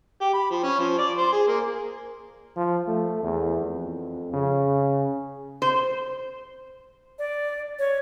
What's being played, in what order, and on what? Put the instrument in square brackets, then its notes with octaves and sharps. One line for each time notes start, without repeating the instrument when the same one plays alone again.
[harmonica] G4
B5
F3
C#4
F3
D5
C5
G#4
A#3
[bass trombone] F3
A3
E2
F2
C#3
[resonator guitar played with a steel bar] C5
[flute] D5
C#5